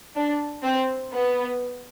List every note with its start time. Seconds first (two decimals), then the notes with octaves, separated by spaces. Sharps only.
0.15 D4
0.63 C4
1.12 B3